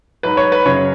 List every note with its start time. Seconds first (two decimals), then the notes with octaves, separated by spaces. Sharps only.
0.23 G#2 F#3 B4
0.37 C#5
0.52 B4
0.66 F#2 C#3 F#3 C#5